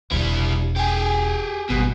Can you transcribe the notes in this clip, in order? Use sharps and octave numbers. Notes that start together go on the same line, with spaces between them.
E1 G3 D4 E4
G4 G#4
G#1 G#2 B2 G3